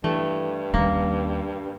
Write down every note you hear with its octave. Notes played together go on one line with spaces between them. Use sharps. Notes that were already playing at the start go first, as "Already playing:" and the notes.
G2 E3 A3
D#2 G3 A#3 C#4